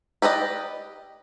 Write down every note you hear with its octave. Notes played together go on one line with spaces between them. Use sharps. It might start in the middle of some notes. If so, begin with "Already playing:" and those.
G4 B4 D5 D#5